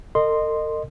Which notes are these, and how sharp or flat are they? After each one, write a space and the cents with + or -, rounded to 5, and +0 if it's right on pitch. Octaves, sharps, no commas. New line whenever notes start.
A#4 -45 D#5 -20 C6 +0